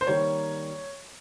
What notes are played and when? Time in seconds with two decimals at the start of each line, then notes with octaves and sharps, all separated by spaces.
0.01 C5
0.07 D#3 G3 A#3 C#5